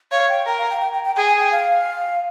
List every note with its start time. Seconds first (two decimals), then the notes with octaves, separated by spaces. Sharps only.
0.12 C#5 F5
0.29 G5
0.46 A#4 G5
0.58 F5
0.70 G5
0.81 G5
0.93 G5
1.04 G5
1.16 G#4 G5
1.27 G#5
1.39 G5
1.52 F5